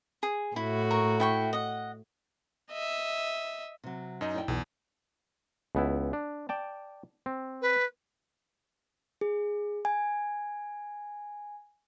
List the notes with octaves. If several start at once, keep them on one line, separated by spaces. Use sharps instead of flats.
G#4
A2 E4 F#4
A#4 C#6
E4 G5 C#6
D#5 F#5
D#5 E5
C3 F#3
F#2 D#4 D#5
E4 D5 G5
B1 E2
C#2 B3 E4
D4
D5 G5 A5
C4
B4
G#4
G#5